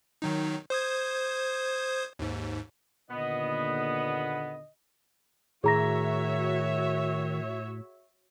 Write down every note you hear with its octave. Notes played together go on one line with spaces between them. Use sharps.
D#3 F#3 D#4
C5 D#6 G#6
D#2 G#2
D#2 A#2 D3 B3 D#5
A2 D#3 F#4 G#4 C#5 E5 A#5 A#6